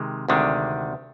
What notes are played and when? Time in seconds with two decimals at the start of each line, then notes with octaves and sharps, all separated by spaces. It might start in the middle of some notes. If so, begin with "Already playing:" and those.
Already playing: C3 D#3 G#3
0.29 D2 C3 D#3 G#3 D4